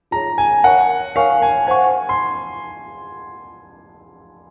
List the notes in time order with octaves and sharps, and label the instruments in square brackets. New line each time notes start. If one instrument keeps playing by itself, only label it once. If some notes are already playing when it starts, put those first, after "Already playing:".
[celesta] F4 G#4 C#5 [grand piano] A#5
[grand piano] G#5
[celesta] A#4 C#5 G#5 C#6 [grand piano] F#5
[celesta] A#4 C#5 G#5 C#6 [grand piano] F5
[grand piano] G#5
[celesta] C5 F#5 C#6 [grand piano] G#5
[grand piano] C6